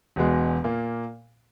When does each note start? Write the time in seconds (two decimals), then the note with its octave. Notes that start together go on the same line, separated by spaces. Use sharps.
0.16 E1 E2 B2 G#3
0.64 A#2 A#3